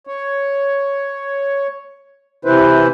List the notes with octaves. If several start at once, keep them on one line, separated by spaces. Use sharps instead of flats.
C#5
C3 E3 E4 B4 C5